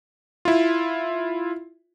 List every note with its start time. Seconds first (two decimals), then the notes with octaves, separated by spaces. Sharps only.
0.45 E4 F4